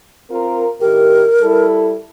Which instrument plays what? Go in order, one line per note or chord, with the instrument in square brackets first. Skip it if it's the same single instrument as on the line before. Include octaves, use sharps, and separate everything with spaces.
[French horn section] C4 F4 A#4
[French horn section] A2 D#3 G4 [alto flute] A#4
[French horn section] G3 E4 A4